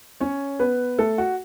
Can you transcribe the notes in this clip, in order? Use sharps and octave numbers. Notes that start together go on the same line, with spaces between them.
C#4 C#5
B3 B4
A3 A4
F#4